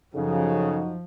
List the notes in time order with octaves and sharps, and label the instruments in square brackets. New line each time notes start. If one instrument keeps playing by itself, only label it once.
[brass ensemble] F#2 D#4 F#4 [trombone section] C#3 [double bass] F3 [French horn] A4